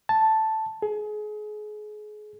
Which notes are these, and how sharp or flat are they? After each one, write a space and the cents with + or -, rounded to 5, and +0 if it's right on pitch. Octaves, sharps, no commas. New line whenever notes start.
A5 +0
G#4 +30